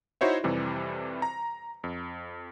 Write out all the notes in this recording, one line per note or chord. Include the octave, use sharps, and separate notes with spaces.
D#4 E4 F#4 C5 C#5 E5
F2 C3 E3 G3
A#5
F2